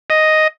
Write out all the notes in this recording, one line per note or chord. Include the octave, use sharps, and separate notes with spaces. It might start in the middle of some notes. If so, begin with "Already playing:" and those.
D#5